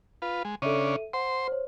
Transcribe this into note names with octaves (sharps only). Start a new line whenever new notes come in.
F4 B4
G#3
C#3 C#4 D4 A4 E5 D#7
C5 F#5 C6
C5 C#5